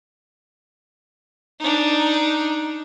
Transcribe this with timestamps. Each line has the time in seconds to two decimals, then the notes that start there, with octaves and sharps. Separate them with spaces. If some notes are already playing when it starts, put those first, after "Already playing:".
1.60 D4 D#4